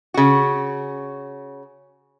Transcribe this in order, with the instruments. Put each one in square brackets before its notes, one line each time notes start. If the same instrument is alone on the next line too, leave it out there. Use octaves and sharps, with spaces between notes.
[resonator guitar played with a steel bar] C#3 F#4